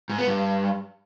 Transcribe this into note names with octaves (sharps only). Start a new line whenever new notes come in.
G#2
B3
G2